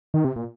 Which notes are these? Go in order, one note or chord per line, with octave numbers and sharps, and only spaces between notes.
D#3
C3
A#2